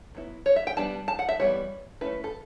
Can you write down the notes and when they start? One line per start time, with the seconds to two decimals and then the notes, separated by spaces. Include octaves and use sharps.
0.15 F#3 B3 E4
0.46 C#5
0.56 E5
0.67 G5
0.77 G3 B3 D4 A5
1.08 A5
1.19 F#5
1.29 E5
1.40 E3 G3 B3 E4 C#5
2.01 A3 C#4 E4 B4
2.24 A4